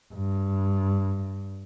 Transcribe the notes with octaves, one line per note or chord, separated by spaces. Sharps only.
G2